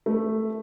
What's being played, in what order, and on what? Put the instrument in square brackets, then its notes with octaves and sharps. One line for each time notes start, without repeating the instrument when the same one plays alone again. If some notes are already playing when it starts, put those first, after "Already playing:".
[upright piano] A3